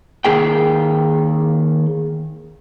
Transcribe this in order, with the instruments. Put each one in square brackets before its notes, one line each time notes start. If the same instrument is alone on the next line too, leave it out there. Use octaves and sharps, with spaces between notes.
[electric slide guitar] D#3 A#3 G#4 G5